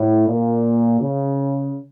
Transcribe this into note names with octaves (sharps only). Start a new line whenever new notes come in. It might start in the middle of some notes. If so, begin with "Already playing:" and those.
Already playing: A2
A#2
C#3